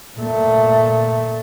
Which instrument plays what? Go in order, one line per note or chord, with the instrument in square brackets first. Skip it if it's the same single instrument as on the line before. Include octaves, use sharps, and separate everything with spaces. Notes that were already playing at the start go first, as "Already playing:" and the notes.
[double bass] A#2 A3